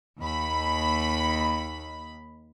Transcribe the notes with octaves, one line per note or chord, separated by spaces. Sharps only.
D#2 B5